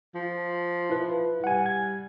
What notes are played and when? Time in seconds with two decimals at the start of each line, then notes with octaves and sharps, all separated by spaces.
0.15 F3
0.90 E4 B4
1.44 G3 F#5 G#5
1.66 G#6